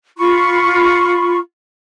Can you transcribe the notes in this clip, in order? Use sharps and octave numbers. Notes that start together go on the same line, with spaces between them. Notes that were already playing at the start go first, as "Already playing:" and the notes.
F4 B5 C#6